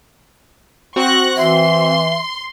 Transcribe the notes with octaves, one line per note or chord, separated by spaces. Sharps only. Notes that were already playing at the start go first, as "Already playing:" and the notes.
C4 F#4 C#6 F#6 A#6
E3 E5 C6